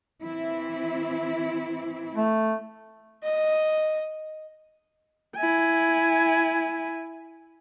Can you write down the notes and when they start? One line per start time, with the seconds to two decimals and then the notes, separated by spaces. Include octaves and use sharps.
0.22 E3 C4 E4
2.14 A3
3.24 D#5
5.37 E4 G#5